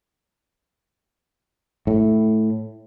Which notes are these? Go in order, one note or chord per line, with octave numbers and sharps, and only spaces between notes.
A2